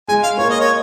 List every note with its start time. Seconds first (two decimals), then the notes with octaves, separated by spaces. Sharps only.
0.08 G#3 G#5
0.23 F5
0.38 A#3 C#5
0.49 D#5
0.60 C#5